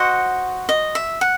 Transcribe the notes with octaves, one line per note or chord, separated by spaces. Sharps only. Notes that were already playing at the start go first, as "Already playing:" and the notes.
Already playing: F#4 C5 D#5 F#5
D#5
E5
F#5